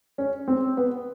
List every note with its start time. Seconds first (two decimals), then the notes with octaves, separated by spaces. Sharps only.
0.18 C#4
0.48 C4
0.77 B3